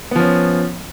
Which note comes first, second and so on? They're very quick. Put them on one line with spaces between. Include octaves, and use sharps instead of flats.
B3 F3 C#4